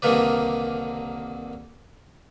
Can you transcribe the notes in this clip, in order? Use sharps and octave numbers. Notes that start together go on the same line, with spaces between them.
C2 D3 D#3 A#3 B4 D5